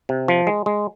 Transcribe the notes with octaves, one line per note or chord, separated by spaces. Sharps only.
C3
F3
G#3
G#3